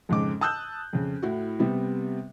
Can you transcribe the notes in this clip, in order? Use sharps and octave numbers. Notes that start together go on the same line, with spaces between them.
F2 G#2 C#3 D6
A5 D#6 E6 F#6 G6
F2 C#3
A2 E4 F#4
C3 G3 B3